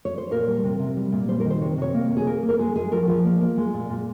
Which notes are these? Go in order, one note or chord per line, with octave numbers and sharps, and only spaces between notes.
C#5
C5
A#2 A#4
G3
C3
C3
G3
A#2
G3 C5
D#3 A#4
C5
C3 C#5
C3 C#5
A#3
A#3
G#4
A#3 A#4
A#3
A#4
G#3 G#4
G#3 G#4
F3 A#4
F3
A#3
A#3
G#3
A#2
A#2